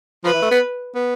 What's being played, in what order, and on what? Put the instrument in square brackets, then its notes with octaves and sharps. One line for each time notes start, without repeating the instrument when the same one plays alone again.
[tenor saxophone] F3 [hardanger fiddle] B4
[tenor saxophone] E3
A3
B3
B3